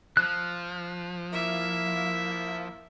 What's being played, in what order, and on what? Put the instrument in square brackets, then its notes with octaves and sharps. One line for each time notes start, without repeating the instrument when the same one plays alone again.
[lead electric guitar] F3 [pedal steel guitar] F#6
[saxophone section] A#3 E4 [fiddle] E5